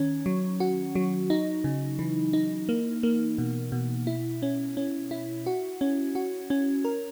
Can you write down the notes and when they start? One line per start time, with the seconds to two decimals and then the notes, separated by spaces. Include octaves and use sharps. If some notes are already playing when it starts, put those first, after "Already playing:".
Already playing: D#3 C#4
0.26 F#3
0.60 F#4
0.95 F#3
1.30 D#4
1.64 C#3
1.99 E3
2.33 D#4
2.69 A#3
3.03 A#3
3.38 B2
3.72 B2
4.07 E4
4.42 C#4
4.77 C#4
5.11 E4
5.46 F#4
5.81 C#4
6.15 F#4
6.50 C#4
6.85 A#4